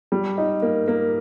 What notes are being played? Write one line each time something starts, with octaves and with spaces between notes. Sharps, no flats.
G3
D#4
A#3
A#3